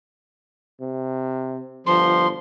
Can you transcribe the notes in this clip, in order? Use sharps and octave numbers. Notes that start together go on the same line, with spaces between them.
C3
G1 F3 C6